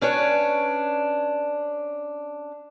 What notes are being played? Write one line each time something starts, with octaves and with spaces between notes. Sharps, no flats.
C#4 D4 B4 C#5